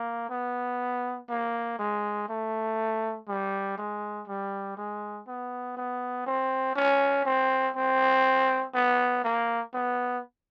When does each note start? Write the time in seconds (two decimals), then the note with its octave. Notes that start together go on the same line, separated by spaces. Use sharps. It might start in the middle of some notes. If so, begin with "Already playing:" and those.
Already playing: A#3
0.30 B3
1.29 A#3
1.79 G#3
2.29 A3
3.28 G3
3.77 G#3
4.28 G3
4.77 G#3
5.27 B3
5.77 B3
6.26 C4
6.76 C#4
7.25 C4
7.75 C4
8.74 B3
9.24 A#3
9.74 B3